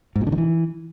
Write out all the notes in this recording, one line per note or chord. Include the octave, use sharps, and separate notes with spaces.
G#2
A#2
D3
D#3
E3